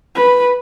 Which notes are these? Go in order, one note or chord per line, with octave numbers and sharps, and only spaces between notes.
B4